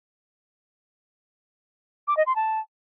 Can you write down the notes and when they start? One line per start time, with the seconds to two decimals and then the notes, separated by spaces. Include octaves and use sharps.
2.08 D6
2.17 D#5
2.26 C6
2.36 A5